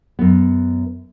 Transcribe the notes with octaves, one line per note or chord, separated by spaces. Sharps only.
F#2 B3